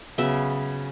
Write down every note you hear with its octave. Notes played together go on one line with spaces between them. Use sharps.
C#3 F#3 B3 E5